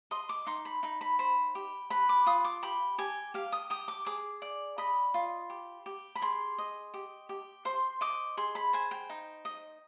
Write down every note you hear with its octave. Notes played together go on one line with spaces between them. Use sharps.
D#5 C6
D6
D#4 C6
B5
D#4 B5
B5
C5 B5
G4
B4 B5
D6
F4 D#6
D6
G4 B5
G4 G#5
G4 F5
D#6
G4 D#6
D6
G#4 D6
D5
D#5 B5
F4
G4
G4
B5
G#4 C6
D#5
G4
G4
C5 C6
D#5 D6
G#4 C6
B5
C5 G#5
G5
D#4
D#5